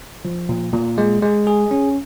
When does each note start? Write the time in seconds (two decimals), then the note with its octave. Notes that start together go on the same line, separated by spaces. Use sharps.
0.25 F3
0.49 A#2
0.73 A#2
0.98 G#3
1.22 G#3
1.47 G#4
1.71 C#4